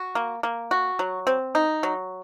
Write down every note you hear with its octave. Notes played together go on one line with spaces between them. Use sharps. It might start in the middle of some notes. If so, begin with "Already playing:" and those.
Already playing: F#4
A#3
A#3
F#4
F#3
C4
D#4
F#3